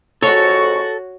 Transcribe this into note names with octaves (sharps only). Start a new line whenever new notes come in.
F2 G#2 F#4 A4 C#5 A5 C#6